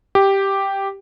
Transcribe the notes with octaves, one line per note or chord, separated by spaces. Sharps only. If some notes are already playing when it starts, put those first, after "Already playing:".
G4